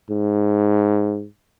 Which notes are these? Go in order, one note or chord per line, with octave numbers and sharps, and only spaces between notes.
G#2